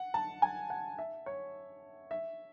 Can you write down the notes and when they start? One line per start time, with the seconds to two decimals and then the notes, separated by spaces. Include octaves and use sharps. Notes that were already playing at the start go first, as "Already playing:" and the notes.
Already playing: F#5
0.14 A5
0.42 G#5
0.70 F#5
0.99 E5
1.26 C#5
2.11 E5